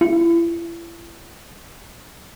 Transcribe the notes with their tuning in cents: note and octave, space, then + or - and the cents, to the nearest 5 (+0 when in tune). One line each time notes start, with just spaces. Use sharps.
E4 +35